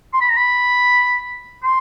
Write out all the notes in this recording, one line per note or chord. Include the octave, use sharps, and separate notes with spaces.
C6
B5
A#5
B5
C6